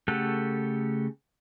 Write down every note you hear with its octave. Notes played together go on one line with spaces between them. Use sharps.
C#3 A3 G4 A4 F#5